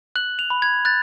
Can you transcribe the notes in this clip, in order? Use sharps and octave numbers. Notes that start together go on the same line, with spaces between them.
F#6 F#7
F7
B5
G#6
F#6 A6